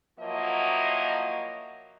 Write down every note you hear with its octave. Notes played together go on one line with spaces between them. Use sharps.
F3 F#3 A#3 E4 C#5 D#5